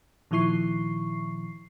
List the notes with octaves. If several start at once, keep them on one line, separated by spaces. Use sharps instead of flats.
A#2 D#3 F3 E4 C#6 C7